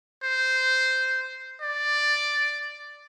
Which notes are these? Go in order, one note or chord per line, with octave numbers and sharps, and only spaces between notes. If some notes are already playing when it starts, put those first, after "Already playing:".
C5
D5